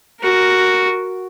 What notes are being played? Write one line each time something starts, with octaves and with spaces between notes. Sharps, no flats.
F#4 A#4